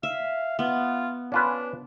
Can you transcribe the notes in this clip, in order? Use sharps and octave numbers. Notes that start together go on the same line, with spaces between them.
E5 F5
B3 F4
C#4 D4 F4 B4